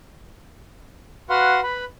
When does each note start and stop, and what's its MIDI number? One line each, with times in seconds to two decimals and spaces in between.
1.30 1.60 66
1.30 1.60 71
1.30 1.60 77
1.30 1.60 78
1.30 1.60 84
1.63 1.85 71
1.63 1.85 83